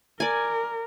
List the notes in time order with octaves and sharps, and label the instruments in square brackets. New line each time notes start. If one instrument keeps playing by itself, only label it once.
[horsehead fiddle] A#4 [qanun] D5 G#5